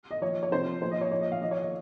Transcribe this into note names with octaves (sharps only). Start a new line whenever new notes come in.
D#5
A#2 F3 C#5
C#5
C3 F3 C5
A#2 F3 C5
D#5
C#5
A#2 F3 C#5
D#5
F5
A#2 F3 D#5
C#5
D#5